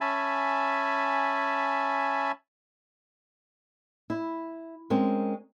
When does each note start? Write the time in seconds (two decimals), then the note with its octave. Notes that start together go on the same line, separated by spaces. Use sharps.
0.01 C#4 E5 G#5 A5 B5
4.10 E4
4.90 G#3 C4 C#4 A#4